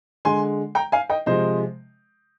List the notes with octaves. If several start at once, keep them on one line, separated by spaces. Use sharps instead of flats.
D3 G#3 G#5 C6
G5 A#5
F5 G#5
D#5 G5
C3 F3 G#3 C5 D#5